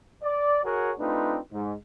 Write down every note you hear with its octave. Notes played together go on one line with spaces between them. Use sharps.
D5
F#4 G#4 A#4 C#5 F#5
A3 C4 D4 D#4 F4 B4
G#2